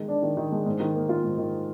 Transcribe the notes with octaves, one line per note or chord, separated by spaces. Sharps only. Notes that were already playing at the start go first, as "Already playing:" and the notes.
Already playing: D#3 G#3
D4
D#3
D#3
G#3
G#2
D#3
A#3
F4
G#2
D#3